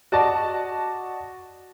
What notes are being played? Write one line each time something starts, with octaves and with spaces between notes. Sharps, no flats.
F#4 D5 D#5 A5